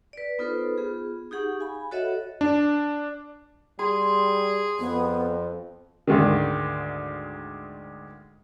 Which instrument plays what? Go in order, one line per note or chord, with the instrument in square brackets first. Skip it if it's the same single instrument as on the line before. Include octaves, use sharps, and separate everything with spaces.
[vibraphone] B4 D5
B3 D#4 F4 A4 B4 C5
B3 F4 G#4
D#4 G4 G#4 F#5 C#6
F5 G#5 B5
F#4 A4 C#5 D#5 E5 F#5
[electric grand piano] D4
[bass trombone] G3 [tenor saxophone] G#4 [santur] C6
[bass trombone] F2 [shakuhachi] B3
[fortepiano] D2 G#2 D#3